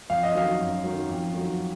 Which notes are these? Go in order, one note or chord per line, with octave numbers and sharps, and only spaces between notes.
F2 F5
D#5
D#3 F#3 F5
F#2
D#3 F#3
F2
D#3 F#3